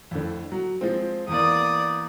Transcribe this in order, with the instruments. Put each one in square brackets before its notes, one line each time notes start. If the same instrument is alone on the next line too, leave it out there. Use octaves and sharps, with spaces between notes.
[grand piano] F2 A2 D3
F#3
F3 G#3 C4
[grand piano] E2 A#3 [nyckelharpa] D5 D#6